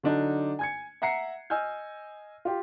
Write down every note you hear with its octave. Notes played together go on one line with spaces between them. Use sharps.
D3 F#3 D4 D#4
G#5 G#6 C#7
E5 F#5 A#5 C7 C#7
D#5 G#5 E6 F6 G6
F4 G4